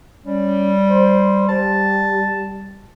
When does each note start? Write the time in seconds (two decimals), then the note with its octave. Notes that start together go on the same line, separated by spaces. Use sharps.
0.25 G3 C#4
0.90 C5
1.48 G3 A5